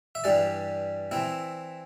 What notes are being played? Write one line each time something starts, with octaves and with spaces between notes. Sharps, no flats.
E5
G2 E3 G3 D5
E3 C4 E4